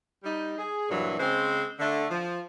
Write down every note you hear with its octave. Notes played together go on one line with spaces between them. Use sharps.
G3 D#4
G#4
G2 A#2 E3 F#3
C#3 G#3 C4 C5
D3 A3
F3